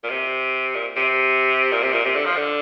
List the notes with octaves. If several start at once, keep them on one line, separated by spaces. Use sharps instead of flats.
A#2
C3
A#2
C3
A#2
C3
A#2
C3
D3
F3
D3